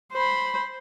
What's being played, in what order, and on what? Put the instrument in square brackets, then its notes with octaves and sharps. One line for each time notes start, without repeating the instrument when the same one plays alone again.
[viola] C5 B5